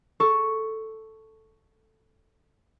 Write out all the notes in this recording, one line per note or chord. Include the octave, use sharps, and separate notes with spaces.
A4 C#6